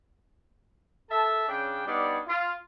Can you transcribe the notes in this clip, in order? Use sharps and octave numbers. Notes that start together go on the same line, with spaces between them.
A4 E5 A5
C#3 C#4 D4 G5
G3 B3 D4 D#4 C#5 D5
F4